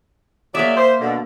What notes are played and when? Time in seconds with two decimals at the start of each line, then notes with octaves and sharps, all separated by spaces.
0.55 F#3 A#3 G#4 D5 E5
0.77 C5
1.01 B2 D3